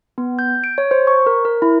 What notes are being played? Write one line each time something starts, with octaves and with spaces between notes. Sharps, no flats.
B3
G6
D7
C#5
C5
C#6
A#4
A#4
E4